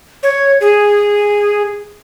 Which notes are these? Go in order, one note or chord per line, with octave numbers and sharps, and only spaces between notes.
C#5
G#4